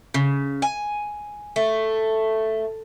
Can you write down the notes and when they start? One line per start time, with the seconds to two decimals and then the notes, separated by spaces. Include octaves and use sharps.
0.14 C#3
0.62 G#5
1.56 A3